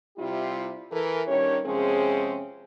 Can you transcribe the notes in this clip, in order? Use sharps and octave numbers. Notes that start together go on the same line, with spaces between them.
C3 G3 E4 F4 G4
E3 A4 A#4
G2 D#3 C#4 G4 C#5
C3 F3 G#3 C4 C#4 G#4